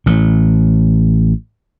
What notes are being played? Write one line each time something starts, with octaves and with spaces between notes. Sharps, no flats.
A1 A2